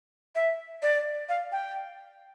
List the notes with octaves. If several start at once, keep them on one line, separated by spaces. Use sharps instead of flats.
E5
D5
F5
G5